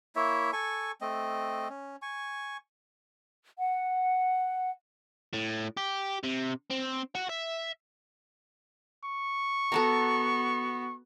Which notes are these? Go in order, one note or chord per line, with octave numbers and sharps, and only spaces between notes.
A#3 E4 C#5 E5
A4 G#5 C#6
A3 C4 D#5
C#4
G#5 C#6
F#5
A2
G4
C3
C4
F#4 F#5
E5
C#6
B3 F#4 A4 A5 A#5